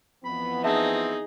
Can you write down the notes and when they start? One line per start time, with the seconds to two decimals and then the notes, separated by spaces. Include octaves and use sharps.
0.25 F2 E3 B3 B5
0.64 C4 D#4 G#4 E5 A5